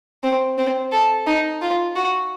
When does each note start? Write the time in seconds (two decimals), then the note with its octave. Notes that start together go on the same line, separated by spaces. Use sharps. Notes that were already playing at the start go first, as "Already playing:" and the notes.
0.23 C4
0.58 C4
0.92 A4
1.27 D#4
1.62 F4
1.96 F#4